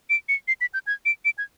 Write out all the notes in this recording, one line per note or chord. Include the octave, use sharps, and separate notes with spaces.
D7
C#7
C7
B6
G6
G#6
D7
D7
G#6